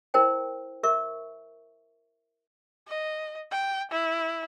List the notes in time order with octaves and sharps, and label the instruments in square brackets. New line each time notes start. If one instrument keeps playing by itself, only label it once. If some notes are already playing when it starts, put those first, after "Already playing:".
[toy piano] E4 A#4 C5 G5
A#4 E5 C#6
[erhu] D#5
G5
E4